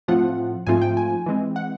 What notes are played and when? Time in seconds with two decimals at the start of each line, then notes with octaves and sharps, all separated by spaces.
0.08 A2 F3 A3 C4 F4 F#5
0.67 G#2 F3 A3 C4 F4 G#5
0.81 G5
0.97 G#5
1.26 E3 G#3 C4
1.56 F#5